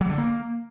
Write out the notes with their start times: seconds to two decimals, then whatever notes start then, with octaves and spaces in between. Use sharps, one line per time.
0.01 F#3
0.09 D3
0.18 A#3